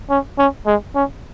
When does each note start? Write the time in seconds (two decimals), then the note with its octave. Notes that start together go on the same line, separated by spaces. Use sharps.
0.10 C#4
0.39 C#4
0.67 G#3
0.95 C#4